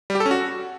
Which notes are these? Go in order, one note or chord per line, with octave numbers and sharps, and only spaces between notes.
G3
G4
A4
C#4
F#4